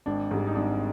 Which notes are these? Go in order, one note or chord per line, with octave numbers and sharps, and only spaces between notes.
G#1 D4
G#2 G3
D#4
G#1 D4